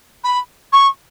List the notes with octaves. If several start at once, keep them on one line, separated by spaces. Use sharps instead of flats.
B5
C#6